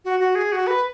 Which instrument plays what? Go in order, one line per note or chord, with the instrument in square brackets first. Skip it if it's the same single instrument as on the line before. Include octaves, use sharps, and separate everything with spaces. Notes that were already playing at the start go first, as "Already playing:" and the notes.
[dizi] F#4
F#4
G#4
F#4
B4